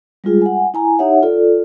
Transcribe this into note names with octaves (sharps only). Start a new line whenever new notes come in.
G3 G#3 F4 G#4
F#5 G#5
E4 G#5 A#5
D#4 G4 C#5 E5 F#5
F4 A4 D5